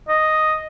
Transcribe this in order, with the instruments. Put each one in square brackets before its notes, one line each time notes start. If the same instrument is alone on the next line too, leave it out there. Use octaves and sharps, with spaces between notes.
[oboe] D#5